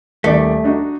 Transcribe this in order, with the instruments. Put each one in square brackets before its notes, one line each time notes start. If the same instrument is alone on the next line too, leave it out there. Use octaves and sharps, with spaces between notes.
[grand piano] D#1 D#3 D5 [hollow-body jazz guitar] A3
[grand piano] D4 D#4 F#4